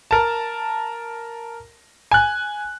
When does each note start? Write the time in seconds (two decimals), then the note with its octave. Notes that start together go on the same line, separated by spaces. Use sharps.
0.11 A#4 A5
2.11 G#5 F#6